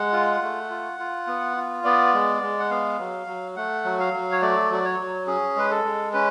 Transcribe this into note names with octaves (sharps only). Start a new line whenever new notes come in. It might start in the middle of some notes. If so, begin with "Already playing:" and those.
Already playing: G#3 F#5
F4
A3
F4
F4
B3
F4
B3 D5
G#3
G#3
F#5
B3 F5
F#3
F#3
A3 F#5
F#3
F5
F#3
C#5
A3 D5
F#3 D5
C#5
F#3
C#4 G#4
G#3 B4
A4
G#3
C#4 B4